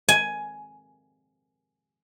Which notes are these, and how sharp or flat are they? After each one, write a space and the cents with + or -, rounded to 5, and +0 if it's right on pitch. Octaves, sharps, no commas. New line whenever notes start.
G#5 +10